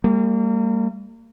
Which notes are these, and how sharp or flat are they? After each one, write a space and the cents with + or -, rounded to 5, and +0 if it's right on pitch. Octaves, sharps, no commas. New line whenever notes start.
G3 +25 A#3 -30